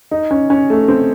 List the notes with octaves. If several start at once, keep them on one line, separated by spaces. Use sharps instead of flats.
D#4
C#4
C#4
A3
C4